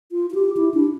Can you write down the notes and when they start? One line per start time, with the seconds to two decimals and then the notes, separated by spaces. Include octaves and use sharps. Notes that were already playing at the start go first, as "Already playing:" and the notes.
0.12 F4
0.30 F4
0.35 G4
0.57 E4
0.74 D4